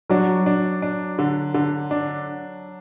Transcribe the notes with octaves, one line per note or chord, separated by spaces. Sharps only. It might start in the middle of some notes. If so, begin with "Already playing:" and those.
F#3 D4 F#4
D4
D4
D3
D3
D4